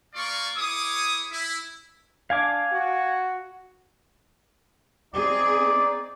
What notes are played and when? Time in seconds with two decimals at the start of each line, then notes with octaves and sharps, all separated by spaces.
0.15 A#3 F4 D5 F5 C6 C#6
0.57 E4 G#4 C#5 D6 D#6
1.32 E4
2.30 D4 F5 G#5 D6
2.72 F#4
5.14 C4 D#4 G#4 D5